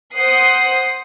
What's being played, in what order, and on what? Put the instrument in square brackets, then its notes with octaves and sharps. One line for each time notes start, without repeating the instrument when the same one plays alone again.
[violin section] C5 F#5 D#6 C7